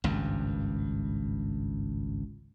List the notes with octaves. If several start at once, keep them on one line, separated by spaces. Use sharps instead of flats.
G#1 C#2 G2